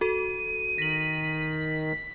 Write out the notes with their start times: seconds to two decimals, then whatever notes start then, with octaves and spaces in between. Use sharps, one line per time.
0.01 F#4 A4 D#7
0.78 D#3 A#6 B6 F#7